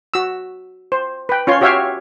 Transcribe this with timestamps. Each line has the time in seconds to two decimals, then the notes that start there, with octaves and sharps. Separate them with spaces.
0.14 F#4 E6
0.92 C5
1.29 B4 G5
1.47 C#4 F4 C#5 C6
1.61 F#4 G4 C#5 E5 F5 G5